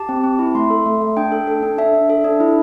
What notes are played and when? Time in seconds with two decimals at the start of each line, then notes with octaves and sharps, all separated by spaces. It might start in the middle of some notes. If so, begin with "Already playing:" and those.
Already playing: G4 A5
0.09 C4
0.24 C4
0.39 E4
0.55 A3 C6
0.70 A4
0.86 A3
1.01 A3
1.17 D4 G5
1.32 A4
1.47 A4
1.63 D4
1.78 D4 E5
1.94 D4
2.10 A4
2.24 D4
2.40 E4